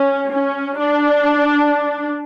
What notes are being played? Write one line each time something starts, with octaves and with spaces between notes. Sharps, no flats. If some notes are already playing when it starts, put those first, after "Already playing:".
Already playing: C#4
C#4
D4